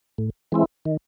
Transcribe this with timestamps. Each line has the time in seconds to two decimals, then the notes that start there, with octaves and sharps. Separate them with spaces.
0.18 A2
0.52 E3 G#3 C4 E4
0.85 D#3